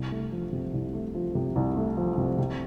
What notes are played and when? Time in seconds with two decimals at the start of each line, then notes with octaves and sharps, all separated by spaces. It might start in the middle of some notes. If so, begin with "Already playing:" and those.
Already playing: C2
0.11 A3
0.32 F3
0.53 C3
0.73 C2
0.93 A3
1.14 F3
1.35 C3
1.56 C2
1.77 A3
1.97 F3
2.18 C3
2.38 C3